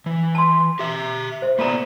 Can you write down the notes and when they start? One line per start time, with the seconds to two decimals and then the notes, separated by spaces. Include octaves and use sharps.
0.06 E3
0.35 A5 C6
0.79 G4 E5
1.42 C5 E5
1.59 A#3 B3 F4 A4 D5 A#5